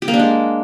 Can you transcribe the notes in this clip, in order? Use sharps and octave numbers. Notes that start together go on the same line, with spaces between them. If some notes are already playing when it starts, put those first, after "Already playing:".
G4
A#3
D4
G#3